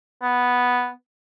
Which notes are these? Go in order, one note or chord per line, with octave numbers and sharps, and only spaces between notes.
B3